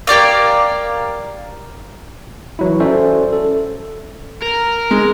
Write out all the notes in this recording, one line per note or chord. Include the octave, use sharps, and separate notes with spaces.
A#3 G4 D5 F5
E3 F#3 E4
C#4 F#4 A4 C5 D5 E5
A4
A#4
G#3